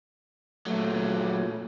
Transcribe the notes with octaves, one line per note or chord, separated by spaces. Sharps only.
A#2 F#3 A3